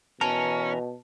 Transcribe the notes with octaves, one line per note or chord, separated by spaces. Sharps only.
B2 E3 C#4 A#4 A5